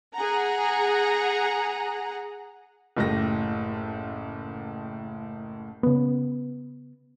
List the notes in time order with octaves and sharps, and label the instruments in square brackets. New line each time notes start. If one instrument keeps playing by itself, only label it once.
[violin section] G#4 F#5 A#5
[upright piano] F#1 A2 G4 A#6
[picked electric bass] C#3 B3